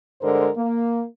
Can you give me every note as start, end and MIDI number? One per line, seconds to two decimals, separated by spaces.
0.21 0.49 43
0.21 0.49 50
0.21 0.49 56
0.21 0.49 70
0.21 0.49 72
0.56 1.02 58